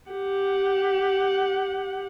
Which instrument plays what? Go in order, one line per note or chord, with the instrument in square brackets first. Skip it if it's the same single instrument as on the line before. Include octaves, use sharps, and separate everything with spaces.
[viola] G4 F#5